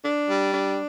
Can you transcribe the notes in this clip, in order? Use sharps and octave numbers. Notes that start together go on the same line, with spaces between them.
D4
G3
D4